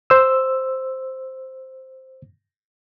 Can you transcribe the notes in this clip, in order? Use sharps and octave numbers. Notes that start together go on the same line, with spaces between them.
C5 E6